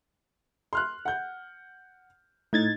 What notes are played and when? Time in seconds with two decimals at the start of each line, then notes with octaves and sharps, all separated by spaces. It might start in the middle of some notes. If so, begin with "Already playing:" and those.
0.73 C6 F6 F#6
1.05 F#5 G6
2.53 A2 D#4 G#6 A6